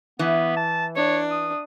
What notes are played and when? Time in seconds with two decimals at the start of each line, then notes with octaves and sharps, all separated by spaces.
0.19 E3 B3
0.57 A5
0.96 D4 C#5
1.31 D#6